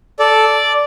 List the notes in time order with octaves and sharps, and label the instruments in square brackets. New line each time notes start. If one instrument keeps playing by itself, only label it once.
[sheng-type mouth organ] A4 D5